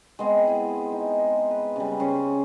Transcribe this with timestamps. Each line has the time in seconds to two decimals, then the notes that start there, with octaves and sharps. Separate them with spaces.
0.19 G#3 B3 C4 G#4
0.48 E4
0.92 D#4
1.51 B4
1.76 C#3 G3
2.00 C#3 C#4 C5